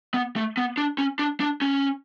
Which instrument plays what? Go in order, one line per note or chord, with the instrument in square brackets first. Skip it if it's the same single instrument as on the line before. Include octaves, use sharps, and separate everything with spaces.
[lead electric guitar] B3
A3
B3
D4
C#4
D4
D4
C#4